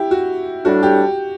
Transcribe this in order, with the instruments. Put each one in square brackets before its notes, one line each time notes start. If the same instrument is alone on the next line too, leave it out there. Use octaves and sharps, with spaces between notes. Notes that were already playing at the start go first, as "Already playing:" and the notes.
Already playing: [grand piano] E4 G4
F#4
[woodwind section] A2 G3 D4 [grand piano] F#4
[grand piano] G4